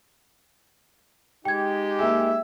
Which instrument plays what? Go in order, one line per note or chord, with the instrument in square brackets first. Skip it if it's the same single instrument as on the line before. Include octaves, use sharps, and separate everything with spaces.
[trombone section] G#3 D#4 G4 [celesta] G5 G#6
[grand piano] A#3 G#4 [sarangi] E5